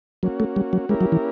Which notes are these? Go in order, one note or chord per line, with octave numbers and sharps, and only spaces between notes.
F#3 A#3 C#4 F#4
A3
G3
F#3
G#3 A#3 C#4 E4 G4 A#4
F#3
E3